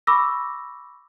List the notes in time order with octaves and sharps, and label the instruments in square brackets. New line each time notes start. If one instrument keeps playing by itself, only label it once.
[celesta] B5 C#6 D6 E6 A#6